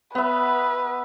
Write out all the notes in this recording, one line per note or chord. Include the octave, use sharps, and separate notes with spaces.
B3 B4 E5